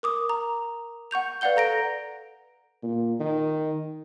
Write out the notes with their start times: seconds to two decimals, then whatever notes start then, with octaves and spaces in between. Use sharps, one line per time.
0.03 A#4 D6 D#6
0.29 A#5
1.11 F#5 C#6 G6 F7
1.41 B4 D5 F5 F#5 G6 G7
1.56 A4 A#5 A#6 D7
2.83 A#2
3.20 D#3